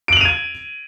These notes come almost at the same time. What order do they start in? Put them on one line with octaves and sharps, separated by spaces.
D7 F#7 F7 D#7 G#6